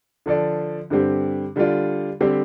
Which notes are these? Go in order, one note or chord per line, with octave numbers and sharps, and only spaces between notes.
D3 F3 D4 A4 D5
G2 D3 G3 C4 G4
D3 G3 D4 F4 D5
D3 G3 C4 G4 C5